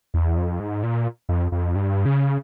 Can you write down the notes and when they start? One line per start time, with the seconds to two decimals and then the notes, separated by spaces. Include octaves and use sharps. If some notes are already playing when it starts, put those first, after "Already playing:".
0.14 E2
0.37 F2
0.60 G#2
0.83 A#2
1.29 F2
1.52 F2
1.75 G2
2.05 C#3